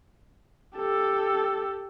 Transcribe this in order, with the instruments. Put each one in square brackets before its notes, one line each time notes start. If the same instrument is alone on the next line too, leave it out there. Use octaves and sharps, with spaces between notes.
[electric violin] G4 A4